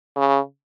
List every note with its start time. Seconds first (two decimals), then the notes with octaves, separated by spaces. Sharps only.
0.16 C#3